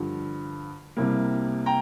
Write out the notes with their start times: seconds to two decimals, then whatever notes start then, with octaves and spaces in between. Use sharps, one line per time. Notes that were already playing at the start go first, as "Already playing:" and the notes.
Already playing: G2 D3 F3
0.97 C2 C3 G3 A#3
1.66 G5 A#5